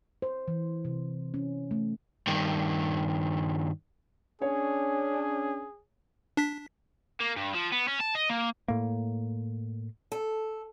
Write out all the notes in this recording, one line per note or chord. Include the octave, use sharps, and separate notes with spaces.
C5
E3
C3
C#4
A3
G2 D#3
C#4 D4 G#4 C#5
D4 B6
A#3
G2
F3
B3
C#4
A5
D#5
A#3
A2 A#3
A4